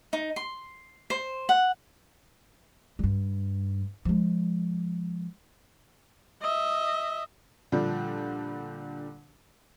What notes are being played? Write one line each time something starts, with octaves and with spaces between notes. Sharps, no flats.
D#4
C6
C5
F#5
G2 G3
F3 G#3
D#5 E5
A#2 D3 F3 G3